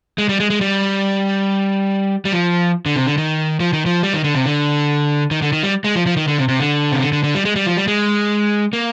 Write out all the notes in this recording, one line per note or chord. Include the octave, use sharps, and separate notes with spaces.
G#3
G3
G#3
G#3
G3
G3
F3
D3
C3
D3
D#3
F3
D#3
F3
G3
D#3
D3
C3
D3
D#3
D3
D#3
G3
G#3
F3
F3
D#3
D3
C3
C3
D3
C3
D3
D3
D3
G3
G#3
G3
F3
G3
G#3
A#3